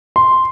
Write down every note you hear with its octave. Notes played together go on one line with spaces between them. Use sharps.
C6